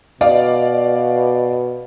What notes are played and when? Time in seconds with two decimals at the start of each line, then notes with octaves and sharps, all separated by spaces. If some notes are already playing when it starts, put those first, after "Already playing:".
0.21 B2 D5 D#5 F5